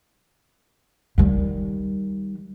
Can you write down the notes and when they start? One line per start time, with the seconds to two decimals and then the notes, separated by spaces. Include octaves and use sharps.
1.18 D#3 G3